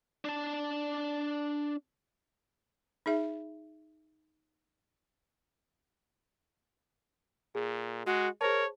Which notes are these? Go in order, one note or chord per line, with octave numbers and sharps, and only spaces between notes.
D4 A5
D#4 G#4 E5
A#2 G#4
G#3 F#4
G#4 A#4 C5 C#5 A5